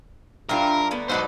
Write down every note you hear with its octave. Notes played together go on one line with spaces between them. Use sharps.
G2 G3 D4 F4 G4 A#4 E5
D3 A3 B3
G#2 B2 F#3 D#4 A4 B4 C5 D5